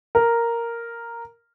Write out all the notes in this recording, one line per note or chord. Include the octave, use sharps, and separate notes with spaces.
A#4